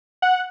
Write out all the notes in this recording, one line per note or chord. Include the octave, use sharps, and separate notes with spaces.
F#5